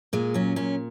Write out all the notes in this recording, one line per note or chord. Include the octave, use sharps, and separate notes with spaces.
A#2 G#3
F#3 C#4
A#2 C#4